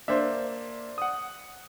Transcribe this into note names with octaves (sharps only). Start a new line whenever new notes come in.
A#3 D4 C5 E5
F#5 D#6